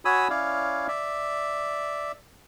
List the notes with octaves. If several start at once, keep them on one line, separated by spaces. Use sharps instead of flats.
F#4 C#5 G#5 B5 D#6 E6
C#4 E4 C#5 D5 F5
D5 E5